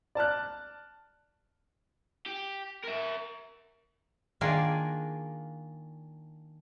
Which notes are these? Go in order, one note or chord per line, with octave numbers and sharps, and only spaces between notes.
D5 A5 F6 F#6
G4
A#4 E5
D#3 A#3 D4 F4 G#4